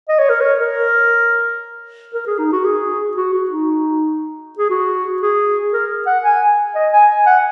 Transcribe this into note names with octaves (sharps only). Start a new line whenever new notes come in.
D#5
C#5
A#4
C#5
A#4
A#4
G#4
D#4
F#4
G#4
F#4
F#4
D#4
G#4
F#4
G#4
A#4
F#5
G#5
D#5
G#5
G#5
F#5